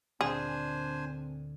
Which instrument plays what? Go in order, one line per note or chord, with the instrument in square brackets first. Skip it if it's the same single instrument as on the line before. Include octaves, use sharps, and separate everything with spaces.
[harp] D2 A#2 D3 [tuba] C4 [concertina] D4 C5 G#5 [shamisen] G#4